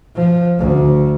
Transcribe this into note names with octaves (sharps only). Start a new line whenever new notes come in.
F3
D2